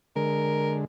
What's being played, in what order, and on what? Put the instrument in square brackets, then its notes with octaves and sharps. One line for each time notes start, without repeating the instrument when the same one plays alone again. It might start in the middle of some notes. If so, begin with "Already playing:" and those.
[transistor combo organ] D3 G#3 [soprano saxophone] A#4